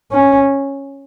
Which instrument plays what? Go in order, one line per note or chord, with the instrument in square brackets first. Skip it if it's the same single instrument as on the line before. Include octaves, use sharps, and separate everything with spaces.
[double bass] C#4